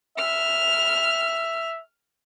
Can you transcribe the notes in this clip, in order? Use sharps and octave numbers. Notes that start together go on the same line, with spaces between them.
E5 F6